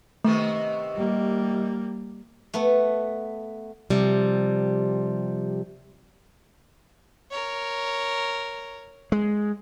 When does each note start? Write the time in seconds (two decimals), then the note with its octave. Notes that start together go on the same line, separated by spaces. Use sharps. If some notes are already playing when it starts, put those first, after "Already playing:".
0.24 C3 D#3 A3 B3
0.96 G3 A#3
2.54 A3 B3
3.90 C3 F3 G3
7.31 A#4 C#5
9.12 G#3